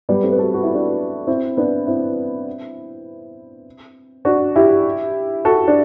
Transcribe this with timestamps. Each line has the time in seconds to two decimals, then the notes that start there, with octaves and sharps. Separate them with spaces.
0.09 G3 B3
0.23 A3 C4
0.32 B4
0.38 F#4 A4
0.54 F#4
0.63 E4
0.74 D4 F#4
1.27 C4 E4
1.57 B3 D4
1.87 C4 E4
4.25 D4 F#4
4.56 E4 G4
5.45 F#4 A4
5.68 D4